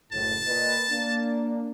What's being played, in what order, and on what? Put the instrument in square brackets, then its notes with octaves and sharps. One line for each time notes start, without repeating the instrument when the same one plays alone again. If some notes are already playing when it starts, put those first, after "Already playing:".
[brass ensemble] F#1 A2 [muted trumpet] A5
[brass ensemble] A#2 B4 D#5
A#3 D4